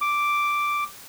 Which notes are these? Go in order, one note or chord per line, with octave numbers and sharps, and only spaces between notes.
D6